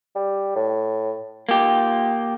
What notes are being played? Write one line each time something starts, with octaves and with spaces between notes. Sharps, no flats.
G3
A2
A#3 F4 G4